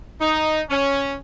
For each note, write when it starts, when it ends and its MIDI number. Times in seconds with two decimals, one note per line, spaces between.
0.20 0.62 63
0.69 1.14 61